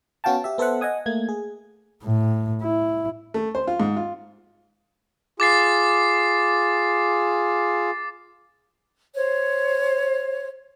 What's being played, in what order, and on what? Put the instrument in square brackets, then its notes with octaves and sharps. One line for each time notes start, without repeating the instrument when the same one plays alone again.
[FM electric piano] B3 C#4 F#4 F5 G5 A5
G4 E5
B3 A4 C5 E5 F#5
D#5 F#5 G#5 D#6
A3 A#3 G#6
G#4
[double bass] A2
E4
[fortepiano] A3
C5
F4
G#2
F4
[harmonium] F4 G#4 [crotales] D6 A6 C7
[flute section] C5 C#5